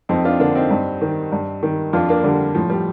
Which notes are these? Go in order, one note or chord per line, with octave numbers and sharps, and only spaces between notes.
F2 C4 D#4
D4 F4
D3 A#3 D4
C4 D#4
G2
D#3
G2
D#3
F2 D4 F4
A#3 D4
D3 G3 A#3
A2 F3
G3